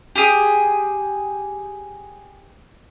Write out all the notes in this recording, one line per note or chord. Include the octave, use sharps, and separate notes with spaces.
G4 G#4